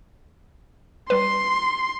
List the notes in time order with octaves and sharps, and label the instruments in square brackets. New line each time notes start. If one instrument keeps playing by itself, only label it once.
[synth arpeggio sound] G3 B4 [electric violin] C6